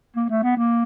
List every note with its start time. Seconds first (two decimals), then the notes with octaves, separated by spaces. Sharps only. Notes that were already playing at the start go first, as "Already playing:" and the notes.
0.16 A#3
0.29 A3
0.43 B3
0.57 A#3